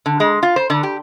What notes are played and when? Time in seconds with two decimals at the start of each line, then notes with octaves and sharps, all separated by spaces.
0.06 D3
0.20 G#3
0.43 F4
0.56 C5
0.70 D3
0.83 G4